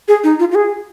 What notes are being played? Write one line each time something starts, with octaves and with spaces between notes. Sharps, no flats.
G#4
D#4
F4
F4
G#4